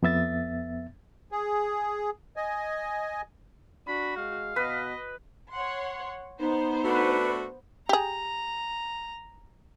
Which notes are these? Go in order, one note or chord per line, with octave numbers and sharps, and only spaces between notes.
F2 B3 E5 A6
G#4
D#5 G#5
D4 F#4 B5
G#3 F5
B2 B4 D#5
C#5 F#5 C6
B3 D#4 C5
A3 D4 F#4 B4
G4 G#4 A#5